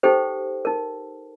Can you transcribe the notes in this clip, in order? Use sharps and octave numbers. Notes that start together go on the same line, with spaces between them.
D#4 G4 A4 C5 G5
D#4 A#4